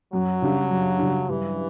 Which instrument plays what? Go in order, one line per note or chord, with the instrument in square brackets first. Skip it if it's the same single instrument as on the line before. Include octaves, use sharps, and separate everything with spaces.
[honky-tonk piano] F#2 [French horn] F#3
[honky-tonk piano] C#3 G3 D4
F#2
C#3 G3 D4
[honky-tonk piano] G2 [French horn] E3